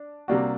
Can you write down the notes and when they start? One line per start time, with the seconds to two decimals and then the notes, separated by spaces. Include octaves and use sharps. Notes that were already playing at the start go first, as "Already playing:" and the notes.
Already playing: D4
0.28 C3 G3 A#3 D4 F#4